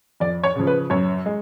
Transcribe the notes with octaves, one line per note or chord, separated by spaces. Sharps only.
F2 D5
C#5
C#3 F3
B4
F#2 C#5
G#3